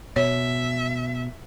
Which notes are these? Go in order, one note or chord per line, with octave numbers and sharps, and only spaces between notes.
B2 C#5 E5